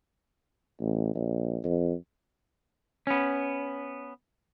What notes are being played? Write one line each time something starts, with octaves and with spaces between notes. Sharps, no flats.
A1
A#1
F2
B3 C#4